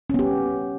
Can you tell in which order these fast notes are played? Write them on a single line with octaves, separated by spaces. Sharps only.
C#4 B3 G4